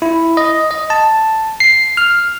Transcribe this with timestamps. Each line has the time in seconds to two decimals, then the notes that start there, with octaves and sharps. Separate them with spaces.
0.02 E4
0.37 D#5
0.71 D#5
0.90 A5
1.60 C7
1.97 F6